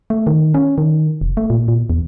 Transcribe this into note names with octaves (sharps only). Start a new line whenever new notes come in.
A3
D#3
C#4
D#3
F1
A3
A#2
A#2
E2